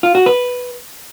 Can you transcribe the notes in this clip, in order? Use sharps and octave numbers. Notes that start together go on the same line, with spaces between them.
F4
F#4
B4